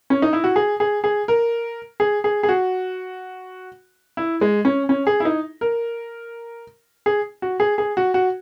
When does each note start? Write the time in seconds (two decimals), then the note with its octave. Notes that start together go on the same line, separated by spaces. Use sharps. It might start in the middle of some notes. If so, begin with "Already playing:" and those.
0.10 C#4
0.22 D#4
0.33 E4
0.44 F#4
0.56 G#4
0.80 G#4
1.04 G#4
1.28 A#4
2.00 G#4
2.24 G#4
2.43 G#4
2.49 F#4
4.17 E4
4.41 G#3
4.65 C#4
4.89 C#4
5.07 G#4
5.20 E4
5.25 D#4
5.61 A#4
7.06 G#4
7.42 F#4
7.60 G#4
7.78 G#4
7.97 F#4
8.14 F#4